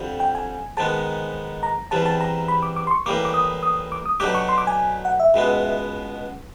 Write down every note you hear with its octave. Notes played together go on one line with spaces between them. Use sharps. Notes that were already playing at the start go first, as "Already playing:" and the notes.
Already playing: F2 D3 G3
G5
G#5
G#2 D#3 G#3 B3 A5
A#5
E2 C3 E3 G3 A5
A5
A#5
B5
D6
D6
C6
C#6
A2 E3 G3 A#3 D6
D6
D#6
D#6
D6
D#6
B2 F#3 A3 D4 G4 D6
C#6
C6
D6
G#5
F#5
E5
C#2 B2 G#3 B3